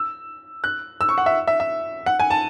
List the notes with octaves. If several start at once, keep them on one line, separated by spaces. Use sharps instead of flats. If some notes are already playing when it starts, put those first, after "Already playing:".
Already playing: E6
F#6
E6
C#6
F#5
E5
E5
E5
F#5
G#5
A5